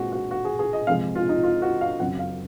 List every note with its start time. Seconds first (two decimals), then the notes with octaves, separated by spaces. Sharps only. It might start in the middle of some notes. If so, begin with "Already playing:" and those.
Already playing: A#2 G#3 C4 F#4
0.12 F#4
0.31 F#4
0.45 G#4
0.59 G#4
0.73 D#5
0.87 C3 F3 G#3 F5
1.15 F4
1.29 D#4
1.43 F4
1.62 F#4
1.81 F5
2.00 F#2 C#3 F#3 C4 F#5
2.19 F5